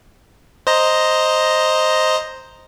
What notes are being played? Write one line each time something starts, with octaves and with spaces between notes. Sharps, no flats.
C5 D#5 A#5